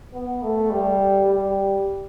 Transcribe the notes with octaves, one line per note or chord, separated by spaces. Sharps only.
B3
A3
G3
G3